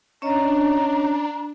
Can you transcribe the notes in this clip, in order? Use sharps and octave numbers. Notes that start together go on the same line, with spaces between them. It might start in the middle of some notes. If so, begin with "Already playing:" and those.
C#4 D4 C#5 D#5 A#5